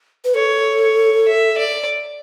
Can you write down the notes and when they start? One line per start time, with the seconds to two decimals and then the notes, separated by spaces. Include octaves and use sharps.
0.25 B4
0.35 A4 C#5
0.81 C#5
1.28 E5
1.58 D5